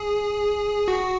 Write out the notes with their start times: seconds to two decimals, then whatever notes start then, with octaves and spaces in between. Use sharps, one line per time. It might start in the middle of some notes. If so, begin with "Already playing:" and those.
Already playing: G#4
0.88 F#4